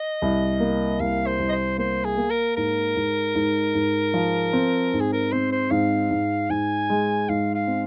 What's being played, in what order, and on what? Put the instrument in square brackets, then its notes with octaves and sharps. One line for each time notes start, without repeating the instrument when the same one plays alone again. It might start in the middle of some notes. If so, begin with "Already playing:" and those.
Already playing: [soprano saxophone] D#5
[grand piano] C2
A#3
[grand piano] C2 [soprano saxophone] F5
[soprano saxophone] C5
[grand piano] C2
[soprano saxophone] D#5
C5
[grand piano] A#3 [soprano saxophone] C5
[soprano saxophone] G#4
[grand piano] A#3
[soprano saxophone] A#4
[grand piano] G#2 [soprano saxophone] A#4
[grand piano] G#2
G#2
G#2
F3
C4
G#2
[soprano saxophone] G#4
A#4
[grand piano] C4 [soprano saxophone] C5
[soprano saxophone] C5
[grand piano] G#2 [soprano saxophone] F5
[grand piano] G#2
[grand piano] G#2 [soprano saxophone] G#5
[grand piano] G#3
[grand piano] G#2 [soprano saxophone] F5
[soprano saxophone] F5
[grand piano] C4